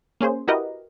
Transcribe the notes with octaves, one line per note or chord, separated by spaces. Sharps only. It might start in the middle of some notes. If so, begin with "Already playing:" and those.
A#3 C#4 G#4 C5
E4 F#4 G4 A#4 B4 D#5